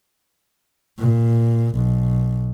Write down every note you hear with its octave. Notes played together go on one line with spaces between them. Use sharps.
A#2
B1